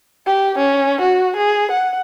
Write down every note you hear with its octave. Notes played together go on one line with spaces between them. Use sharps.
G4
C#4
F#4
G#4
F#5